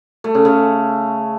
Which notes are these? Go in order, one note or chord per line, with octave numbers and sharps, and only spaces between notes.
A3
C#3
C#3